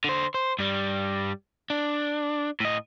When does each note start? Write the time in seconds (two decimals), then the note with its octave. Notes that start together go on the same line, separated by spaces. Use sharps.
0.04 D3 C5
0.34 C5
0.59 G2 G3
1.70 D4
2.60 A2 D#5